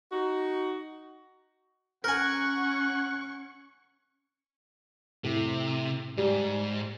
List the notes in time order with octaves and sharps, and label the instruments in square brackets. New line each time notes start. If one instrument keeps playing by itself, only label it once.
[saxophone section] D#4 F#4
[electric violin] C#4 C#6 [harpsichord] A#4 G#5 [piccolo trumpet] F#5 [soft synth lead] F#6
[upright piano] A2 [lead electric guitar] C3
[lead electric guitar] G#2 [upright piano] G3